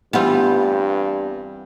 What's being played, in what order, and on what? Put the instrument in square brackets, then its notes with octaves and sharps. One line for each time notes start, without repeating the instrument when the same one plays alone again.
[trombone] G2 [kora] E3 G3 C4 [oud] B3 F4